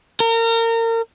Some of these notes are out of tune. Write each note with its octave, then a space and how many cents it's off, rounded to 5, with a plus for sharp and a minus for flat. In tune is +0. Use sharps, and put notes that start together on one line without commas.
A#4 -30